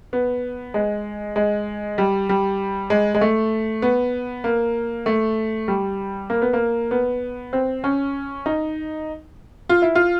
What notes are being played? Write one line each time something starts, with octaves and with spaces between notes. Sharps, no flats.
B3
G#3
G#3
G3
G3
G#3
G#3
A3
B3
A#3
A3
G3
A#3
B3
A#3
B3
C4
C#4
D#4
F4
E4
F4